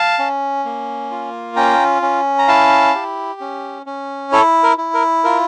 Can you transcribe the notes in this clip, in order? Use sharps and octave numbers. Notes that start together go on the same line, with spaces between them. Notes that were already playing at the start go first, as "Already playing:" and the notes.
Already playing: F5 A5
C#4
A#3
F4
C#4 G5 A#5
C#4
A#5
E4 F5 A5
G4
C#4
C#4
E4 A4 C#5
A#4
E4
A#4
F4 A#4